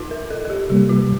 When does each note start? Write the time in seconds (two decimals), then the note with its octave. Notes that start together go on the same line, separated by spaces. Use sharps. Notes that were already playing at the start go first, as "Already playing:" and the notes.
Already playing: D#4 F4
0.11 A#4
0.30 A4
0.45 A4
0.50 G4
0.70 C3 G3 A#3 G4
0.89 F4